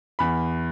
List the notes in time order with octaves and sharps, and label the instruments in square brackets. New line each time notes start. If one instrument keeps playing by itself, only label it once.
[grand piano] E2 B5